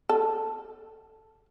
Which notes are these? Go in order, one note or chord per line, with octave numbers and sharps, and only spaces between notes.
A4